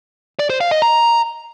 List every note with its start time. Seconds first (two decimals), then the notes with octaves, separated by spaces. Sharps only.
0.39 D5
0.50 C5
0.61 F5
0.71 D#5
0.82 A#5